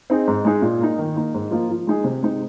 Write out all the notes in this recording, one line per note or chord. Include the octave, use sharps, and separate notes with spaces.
C4 D#4 G#4
G#2
G#3 D#4 G#4
A#2
A#3 D#4
D#3
A#3 D#4
G#2
F3 A#3 F4
F3
G#3 D#4 G#4
C3
G#3 C4 D#4